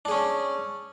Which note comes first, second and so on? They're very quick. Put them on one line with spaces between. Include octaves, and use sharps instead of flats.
D4 G#4 C#4